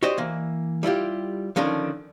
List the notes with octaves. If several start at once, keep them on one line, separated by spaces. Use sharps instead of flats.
F#4 G4 C5 D5 D#5
E3 A#3
G3 E4 F4 G4
D3 D#3 F3 C#4 D4